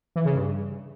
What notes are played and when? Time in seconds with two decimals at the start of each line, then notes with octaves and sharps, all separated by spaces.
0.16 E3
0.25 C#3
0.35 G2